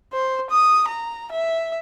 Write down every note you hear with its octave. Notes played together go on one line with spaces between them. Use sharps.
C5
D#6
A#5
E5